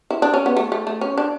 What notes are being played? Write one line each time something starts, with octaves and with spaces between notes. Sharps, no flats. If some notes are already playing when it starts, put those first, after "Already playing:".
E4
D4
C#4
B3
A3
A3
A3
C#4
D4